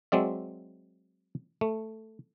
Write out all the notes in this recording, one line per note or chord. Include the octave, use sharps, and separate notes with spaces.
F#3 G#3 C4 D5 E5
A3